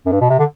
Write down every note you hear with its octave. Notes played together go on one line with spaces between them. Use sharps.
F#2
G2
B2
C3
D3